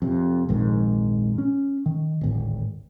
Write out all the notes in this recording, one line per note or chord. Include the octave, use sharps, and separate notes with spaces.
F2 C3
A#1 F2 G#2 D#3
C#4
D#3
D1 G#1